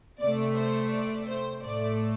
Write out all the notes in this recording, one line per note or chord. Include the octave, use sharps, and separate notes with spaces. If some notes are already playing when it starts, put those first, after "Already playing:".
C3 A3 D5
C5
D5
C5
A2 A3 D5